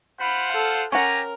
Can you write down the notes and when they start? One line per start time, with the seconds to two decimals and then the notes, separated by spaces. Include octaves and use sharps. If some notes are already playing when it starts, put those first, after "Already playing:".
0.20 F4 C5 F#5 B5
0.52 A4 F5
0.92 C#4 G4 A#4 F#5 G#5 A#5